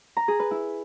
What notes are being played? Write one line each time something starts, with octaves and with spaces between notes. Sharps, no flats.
A#5
G#4
B4
E4